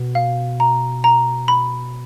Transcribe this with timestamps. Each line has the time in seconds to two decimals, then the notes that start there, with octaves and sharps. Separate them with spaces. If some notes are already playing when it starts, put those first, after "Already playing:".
Already playing: B2
0.15 F5
0.60 A#5
1.04 A#5
1.48 B5